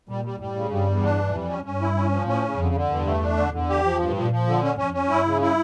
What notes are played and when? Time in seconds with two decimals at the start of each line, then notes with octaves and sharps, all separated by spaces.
0.08 A#2 G3
0.25 G3
0.39 A2 G3
0.55 C#3
0.71 G2 G3
0.87 E2
1.03 D4
1.19 E3
1.33 F2 G3
1.49 C#4
1.65 G2 C#4
1.81 E4
1.96 C#4
2.12 F3
2.27 A2 C#4
2.44 C#3
2.59 F2 D3
2.74 D3
2.90 E2 G2
3.06 A3
3.22 D4
3.37 D3
3.53 E2 D3
3.69 G4
3.84 F3
3.99 G2
4.16 A#2 F3
4.31 F3
4.47 D3
4.63 C#4
4.78 F2 C#4
4.94 C#4
5.09 G2 E4
5.25 C#3
5.41 E4